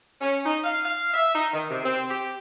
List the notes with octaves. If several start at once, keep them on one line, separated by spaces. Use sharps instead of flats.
C#4
D#4
F5
F5
E5
D#4
D#3
C3
C4
G4